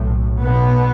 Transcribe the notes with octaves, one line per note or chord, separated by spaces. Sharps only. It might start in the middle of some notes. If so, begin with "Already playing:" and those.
Already playing: B1 A2
B1 B2 B3